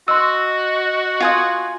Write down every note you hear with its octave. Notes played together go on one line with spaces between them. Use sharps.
F#4 D#5 C6 E6
F4 G#5 D#6